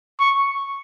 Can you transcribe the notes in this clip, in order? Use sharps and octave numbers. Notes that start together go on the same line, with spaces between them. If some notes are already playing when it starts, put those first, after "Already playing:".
C#6